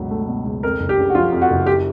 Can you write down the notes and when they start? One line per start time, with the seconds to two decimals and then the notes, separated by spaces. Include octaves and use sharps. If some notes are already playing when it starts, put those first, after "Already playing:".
Already playing: C#2 F#2 B2 F#3
0.11 A3
0.28 B2
0.45 C#2
0.63 F2 A#4
0.80 F#1
0.89 G4
0.98 C#3
1.10 F#4
1.15 F3 F4
1.32 F2
1.42 F#4
1.50 F#1
1.66 G4